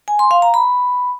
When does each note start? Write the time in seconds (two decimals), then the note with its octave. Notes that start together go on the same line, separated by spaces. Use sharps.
0.08 G#5
0.19 C6
0.31 F5
0.42 A#5
0.54 B5